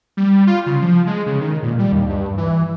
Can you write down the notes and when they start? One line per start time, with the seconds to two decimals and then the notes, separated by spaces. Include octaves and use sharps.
0.17 G3
0.47 F4
0.66 C#3
0.82 F3
1.07 G#3
1.26 C#3
1.41 D#3
1.63 A#2
1.79 G3
1.92 D#2
2.09 G2
2.37 E3